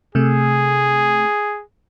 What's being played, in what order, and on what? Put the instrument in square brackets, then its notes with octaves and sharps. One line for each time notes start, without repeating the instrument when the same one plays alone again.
[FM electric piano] C3 A3 [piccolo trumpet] G#4